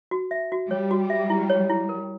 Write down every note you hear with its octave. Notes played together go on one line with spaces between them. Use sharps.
F#4
E5
F#4
G3 C#5
F#4
E5
E4
C#5
E4
A#4